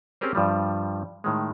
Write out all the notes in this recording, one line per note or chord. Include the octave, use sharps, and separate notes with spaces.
C4 C#4 G4 G#4 A#4 C5
G2 F3 G3
A2 D#3 G#3